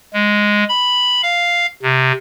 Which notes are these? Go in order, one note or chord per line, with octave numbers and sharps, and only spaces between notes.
G#3
B5
F5
C3